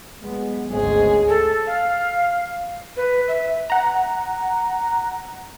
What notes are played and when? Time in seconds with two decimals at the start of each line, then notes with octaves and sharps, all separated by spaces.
0.24 F#3 G#3 B3
0.72 G#1 D2 G#3 C4 C#4 G#4
1.28 A4
1.67 F5
2.96 B4
3.28 E5
3.70 F#5 A#5